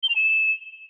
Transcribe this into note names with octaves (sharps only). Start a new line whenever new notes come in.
G7
F7
E7